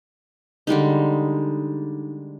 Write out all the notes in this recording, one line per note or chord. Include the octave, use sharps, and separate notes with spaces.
D3 G3 G#3 D#4